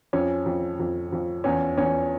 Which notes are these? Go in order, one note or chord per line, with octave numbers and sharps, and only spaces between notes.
F2 C#4
F2
F2
F2
E2 C#4
E2 C#4